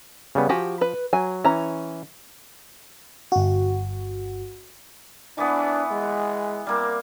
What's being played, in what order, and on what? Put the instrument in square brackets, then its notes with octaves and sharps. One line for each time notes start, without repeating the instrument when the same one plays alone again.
[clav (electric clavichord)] C#3 G3 B3
[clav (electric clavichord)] F3 [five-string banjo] F#4 G4 G#5
[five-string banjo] B4
[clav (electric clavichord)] F#3 [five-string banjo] G#5
[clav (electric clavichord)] E3 [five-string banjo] C#4 A#5
[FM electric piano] G1 F#4
[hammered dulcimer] E3 B3 [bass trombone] D4
[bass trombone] G#3
[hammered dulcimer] G3 A#3 C4